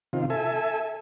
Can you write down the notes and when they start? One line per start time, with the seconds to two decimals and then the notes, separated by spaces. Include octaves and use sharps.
0.13 C3 D#3 F4
0.30 A4 E5 G#5